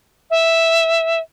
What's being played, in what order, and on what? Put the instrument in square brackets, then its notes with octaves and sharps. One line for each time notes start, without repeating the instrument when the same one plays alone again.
[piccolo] E5